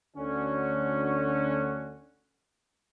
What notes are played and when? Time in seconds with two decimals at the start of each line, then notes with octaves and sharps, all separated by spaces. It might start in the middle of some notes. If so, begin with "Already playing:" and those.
0.17 D2 D3 C#4 F#4